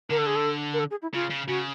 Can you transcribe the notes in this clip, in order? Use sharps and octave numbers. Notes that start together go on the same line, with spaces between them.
D3 A#4
A4
G#4
A4
A#4
A4
G#4
E4
C#3 F4
C#3
C#3 F#4